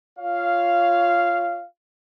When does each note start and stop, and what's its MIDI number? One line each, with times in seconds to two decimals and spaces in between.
0.19 1.65 65
0.19 1.65 73
0.19 1.65 77